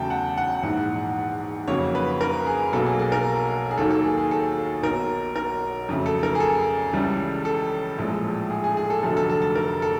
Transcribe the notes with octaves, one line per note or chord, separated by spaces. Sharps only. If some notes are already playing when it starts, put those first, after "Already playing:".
Already playing: E2 C#3 F#3 A3 G5 A5
F#5
F#5
A#1 G#2 E3
F2 C#3 F#3 A#3 C#5
B4
A#4
G#4
B1 B2 F#3 A#3 A4
G#4
G#4
A#4
G#4
D#2 D#3 F#3 A#3 A4
A4
G#4
G#4
A4
B1 B2 F#3 A#4
A#4
F2 C#3 F#3 A3
A4
A#4
G#4
A4
C#2 C#3 E3 G3
A4
A#1 A2 F3 G#3
G#4
G#4
G#4
A4
F1 F2 D3 F#3 A3 A4
A4
A4
A4
A#4
A4